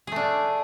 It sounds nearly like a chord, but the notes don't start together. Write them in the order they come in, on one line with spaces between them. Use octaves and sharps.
G#4 A3 D4